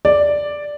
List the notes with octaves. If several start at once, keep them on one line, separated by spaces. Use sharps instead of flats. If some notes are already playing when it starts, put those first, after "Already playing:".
D5